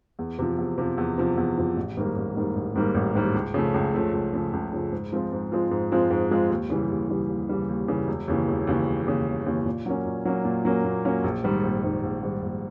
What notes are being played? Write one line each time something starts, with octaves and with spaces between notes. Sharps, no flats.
E2
C3 F3
E2
C3 F3
E2
C3 F3
E2
C3 F3
A1
G#2 D#3 G3 A#3
A1
G#2 D#3 G3 A#3
A1
G#2 D#3 G3 A#3
A1
G#2 D#3 G3 A#3
C#2
C#3 F3 A3
C#2
C#3 F3 A3
C#2
C#3 F3 A3
C#2
C#3 F3 A3
G#2
F3 G#3 C4 F4
G#2
F3 G#3 C4 F4
G#2
F3 G#3 C4 F4
G#2
F3 G#3 C4 F4
D#2
C#3 E3 G3
D#2
C#3 E3 G3
D#2
C#3 E3 G3
D#2
C#3 E3 G3
E1
D#2 C#3 E3
E1
D#2 C#3 E3
E1
D#2 C#3 E3
E1
D#2 C#3 E3
A#2
F#3 A#3 C#4
A#2
F#3 A#3 C#4
A#2
F#3 A#3 C#4
A#2
F#3 A#3 C#4
A#1
G#2 D#3 G3
A#1
G#2 D#3 G3
A#1
G#2 D#3 G3
A#1